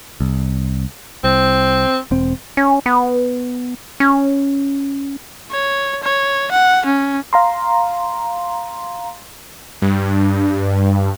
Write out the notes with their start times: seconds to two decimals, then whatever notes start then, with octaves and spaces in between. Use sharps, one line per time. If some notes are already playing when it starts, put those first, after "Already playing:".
0.20 C2
1.24 C2 C4
2.11 E1 C4
2.57 C#4
2.86 B3
4.00 C#4
5.51 C#5
6.03 C#5
6.51 F#5
6.86 C#4
7.33 F5 A#5 C6
9.82 G2